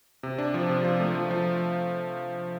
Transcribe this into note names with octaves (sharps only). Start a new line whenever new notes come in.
C3
D4
F3
C3
F3
A3
F3
F3